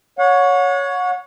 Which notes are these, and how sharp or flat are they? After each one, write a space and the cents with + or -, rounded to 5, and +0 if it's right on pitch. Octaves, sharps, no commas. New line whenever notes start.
C#5 +10 F#5 -35